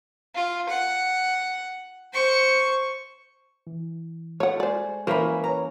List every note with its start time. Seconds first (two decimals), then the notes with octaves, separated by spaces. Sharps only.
0.35 F4
0.69 F#5
2.13 C5 C#6
3.67 E3
4.40 A3 C#5 F#5
4.60 G#3 C5 D5 G#5
5.07 E3 A#3 C#4 A#4 C5 E5 B5
5.44 B4 C#5 A#5